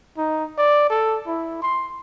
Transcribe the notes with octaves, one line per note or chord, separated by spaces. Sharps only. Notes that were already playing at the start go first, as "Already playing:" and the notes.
D#4
D5
A4
E4
C6